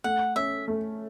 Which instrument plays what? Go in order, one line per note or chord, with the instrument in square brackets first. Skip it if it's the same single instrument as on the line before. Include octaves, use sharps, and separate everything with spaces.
[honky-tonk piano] A3 [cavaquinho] F#5
[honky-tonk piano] C#4 [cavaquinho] E5
[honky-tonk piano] A3